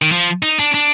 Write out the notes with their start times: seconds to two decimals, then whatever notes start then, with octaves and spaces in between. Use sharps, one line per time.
0.02 D#3
0.12 F3
0.43 D#4
0.59 D4
0.74 D4